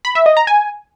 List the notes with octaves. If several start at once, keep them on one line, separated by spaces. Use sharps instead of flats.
B5
E5
D#5
A#5
G#5